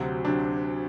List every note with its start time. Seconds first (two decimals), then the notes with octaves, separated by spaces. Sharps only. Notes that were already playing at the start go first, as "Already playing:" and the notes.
Already playing: D2 C3 F#3 C4 F#4
0.25 C3 F#3 C4 D4